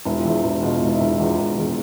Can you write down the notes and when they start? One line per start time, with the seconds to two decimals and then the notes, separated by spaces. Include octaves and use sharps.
0.05 E1 E4
0.16 F4
0.25 E2 E4
0.44 E1
0.62 B2 F4
0.73 E4
0.82 E1 D#4
0.95 E4
1.01 E1
1.09 E4
1.20 E2 F4
1.39 E1
1.57 E2